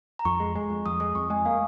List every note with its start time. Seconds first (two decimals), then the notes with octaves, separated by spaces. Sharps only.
0.19 A#5
0.25 F2 C#6
0.40 G#3
0.55 G#3
0.70 F2
0.86 F2 D#6
1.00 G#3 D#6
1.15 F2 C#6
1.30 G#3 G#5
1.45 A#3 F5